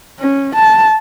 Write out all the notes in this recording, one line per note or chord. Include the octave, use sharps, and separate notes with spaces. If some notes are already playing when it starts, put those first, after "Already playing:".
C#4
A5